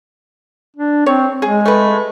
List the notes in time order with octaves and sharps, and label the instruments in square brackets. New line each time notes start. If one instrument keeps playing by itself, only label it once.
[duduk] D4
[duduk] C4 [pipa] C#5
[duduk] G#3 [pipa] G#4
[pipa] A3 B4